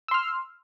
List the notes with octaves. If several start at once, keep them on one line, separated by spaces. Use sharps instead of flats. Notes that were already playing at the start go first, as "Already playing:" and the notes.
C6 E6 F6